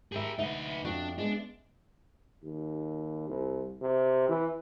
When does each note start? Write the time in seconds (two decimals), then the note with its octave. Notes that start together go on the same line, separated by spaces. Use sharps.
0.12 G4 G#4 A#4 E5
0.39 D2 D#4 B4 E5
0.85 F2 D4 F#4
1.18 G#3 B3 D4
2.43 D#2
3.28 C2
3.82 C3
4.29 E3